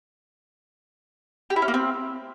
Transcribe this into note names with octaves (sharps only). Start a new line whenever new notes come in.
G4
E4
C#4
A#3
C4